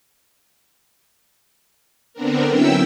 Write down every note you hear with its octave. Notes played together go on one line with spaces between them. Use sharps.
D3 B3 C4 D4 A#4
F#3 C#4 E4 E5 G5 E6